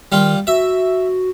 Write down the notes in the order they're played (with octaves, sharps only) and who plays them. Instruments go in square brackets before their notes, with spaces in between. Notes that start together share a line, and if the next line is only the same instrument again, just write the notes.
[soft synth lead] D#3 [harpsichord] G3 F4
[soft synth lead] F#4 [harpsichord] E5